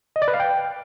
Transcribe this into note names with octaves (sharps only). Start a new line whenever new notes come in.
D#5
D5
B4
F5
G5